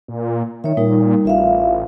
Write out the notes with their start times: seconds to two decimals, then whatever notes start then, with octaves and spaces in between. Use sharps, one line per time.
0.08 A#2
0.64 D#3 C#5 E5
0.77 A#2 G3 D#4 A#4
1.25 A1 F4 E5 F5